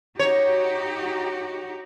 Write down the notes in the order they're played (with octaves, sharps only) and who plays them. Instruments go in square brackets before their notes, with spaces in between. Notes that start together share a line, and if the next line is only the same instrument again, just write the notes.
[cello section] D#4 F#4 G4 [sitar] C#5